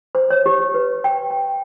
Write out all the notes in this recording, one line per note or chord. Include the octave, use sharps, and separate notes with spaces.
C5
C#5
G4
B4
G5
G5